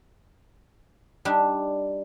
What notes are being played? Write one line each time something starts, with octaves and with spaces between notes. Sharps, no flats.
G3 D4 D#4